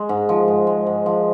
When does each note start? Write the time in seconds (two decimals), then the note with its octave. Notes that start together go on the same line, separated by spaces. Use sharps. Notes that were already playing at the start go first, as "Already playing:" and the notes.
Already playing: G#3
0.09 G#2
0.29 F3
0.48 G#2
0.67 G#3
0.87 G#2
1.06 F3